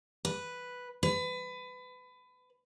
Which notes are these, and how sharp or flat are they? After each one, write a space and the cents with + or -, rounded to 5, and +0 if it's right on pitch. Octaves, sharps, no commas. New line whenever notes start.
B4 +0
B4 +25